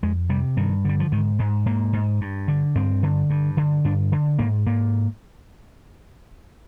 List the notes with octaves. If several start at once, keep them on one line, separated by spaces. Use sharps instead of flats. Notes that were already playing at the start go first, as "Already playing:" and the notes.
F2 G#3
C3 G3
G2 D#3
D3 G3
F3
G#2 D#3
G#2 G#3
G#2 A#3
G#2
G2
D3
G2 C4
D3
G2
D3
G2 D4
D3
G#2 A#3
G#2 A#3